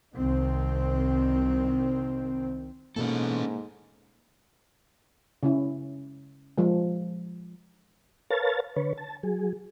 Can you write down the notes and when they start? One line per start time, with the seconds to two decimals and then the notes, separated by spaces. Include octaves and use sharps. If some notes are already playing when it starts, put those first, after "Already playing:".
0.15 C2 D#3 C4
2.96 G#2 B2 E3 A3 A#3 C#4 A4
5.43 C#3 C#4 E4
6.58 F3 G#3
8.30 A#4 B4 C#5 F5 A5 A6
8.76 D3 B4 C#5
8.98 A5
9.23 F#3 G#4